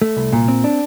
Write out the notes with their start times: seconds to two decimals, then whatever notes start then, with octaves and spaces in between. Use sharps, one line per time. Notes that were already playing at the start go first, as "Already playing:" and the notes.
0.02 A3
0.17 C2
0.33 A#2
0.48 C4
0.64 D4